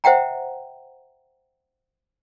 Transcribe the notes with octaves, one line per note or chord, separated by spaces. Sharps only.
C5 E5 F#5 G5 A#5